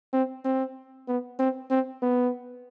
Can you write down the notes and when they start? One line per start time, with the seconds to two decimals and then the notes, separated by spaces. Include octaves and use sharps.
0.13 C4
0.45 C4
1.08 B3
1.39 C4
1.70 C4
2.02 B3